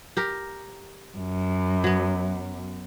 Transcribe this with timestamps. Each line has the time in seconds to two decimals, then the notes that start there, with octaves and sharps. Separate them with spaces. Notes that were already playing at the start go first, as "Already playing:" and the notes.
0.17 G4 A#4
1.18 F#2
1.84 F#3 B3